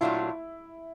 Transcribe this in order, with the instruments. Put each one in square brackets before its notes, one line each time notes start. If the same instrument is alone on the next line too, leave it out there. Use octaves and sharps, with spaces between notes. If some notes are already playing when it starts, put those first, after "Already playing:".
[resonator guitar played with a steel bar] A#2 F#3 A3 D4 F4 [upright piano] E4